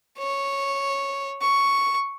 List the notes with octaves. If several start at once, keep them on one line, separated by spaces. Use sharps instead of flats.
C#5
C#6